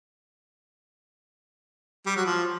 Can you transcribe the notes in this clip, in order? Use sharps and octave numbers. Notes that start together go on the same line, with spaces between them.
G3
F#3
F3